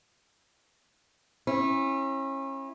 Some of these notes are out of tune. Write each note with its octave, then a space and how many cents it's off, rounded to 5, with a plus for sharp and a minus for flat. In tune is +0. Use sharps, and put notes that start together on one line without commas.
C#4 -35 E4 +0